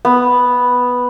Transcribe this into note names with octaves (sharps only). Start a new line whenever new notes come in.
B3